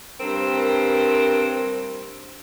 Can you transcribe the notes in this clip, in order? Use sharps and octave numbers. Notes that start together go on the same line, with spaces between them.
G2 C4 A#4